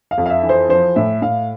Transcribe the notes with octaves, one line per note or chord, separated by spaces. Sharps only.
F5
F2
F5
E5
E3
C5
F3 C5
A2 E5
A2 F5